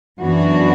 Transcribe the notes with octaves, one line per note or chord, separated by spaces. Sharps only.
F#2 E3 B3 D4 F#4